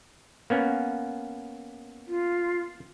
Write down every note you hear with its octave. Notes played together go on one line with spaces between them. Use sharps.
A#3 B3 C#4
F4